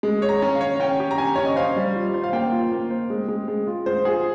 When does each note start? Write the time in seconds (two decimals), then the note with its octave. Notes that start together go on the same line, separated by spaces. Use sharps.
0.03 G#3
0.22 C#5
0.29 A#5
0.42 C#4
0.55 F5
0.61 C#5
0.80 C#4 G5
1.00 G4
1.11 A#5
1.18 C#4 G#5
1.35 C#4 C#5
1.46 D#5
1.56 C5 F5
1.76 G3
1.95 F4
2.14 C5
2.23 F5
2.33 A#3 G5
2.52 F4
2.72 A#3
2.90 C5
3.10 G#3
3.28 G#3
3.48 G#3
3.67 F4
3.86 G#3 C5
4.05 F4 G#4